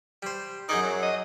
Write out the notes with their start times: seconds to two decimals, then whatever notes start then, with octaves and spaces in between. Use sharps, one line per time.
0.23 G3 C5
0.69 F#2 D#4 G#4 D5
0.83 F#3
1.03 D#5